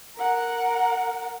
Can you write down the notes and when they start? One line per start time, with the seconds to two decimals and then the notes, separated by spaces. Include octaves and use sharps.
0.16 A#4 F#5